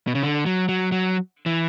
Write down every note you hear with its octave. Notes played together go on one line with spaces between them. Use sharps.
B2
C#3
D3
F#3
F#3
F#3
E3